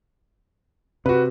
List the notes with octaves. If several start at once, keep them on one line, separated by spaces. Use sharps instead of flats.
C3 F#4 B4